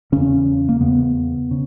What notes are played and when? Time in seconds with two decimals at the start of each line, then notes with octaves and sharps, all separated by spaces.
0.12 E2 C#3 C#4
0.69 A#3
0.80 E2 C#3 B3
1.51 C#3